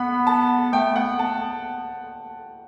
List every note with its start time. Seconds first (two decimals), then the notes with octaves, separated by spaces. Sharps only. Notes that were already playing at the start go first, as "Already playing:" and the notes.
Already playing: B3 F#5 B5
0.27 A5
0.73 A3 G5
0.96 B3 F#5
1.19 B3 A5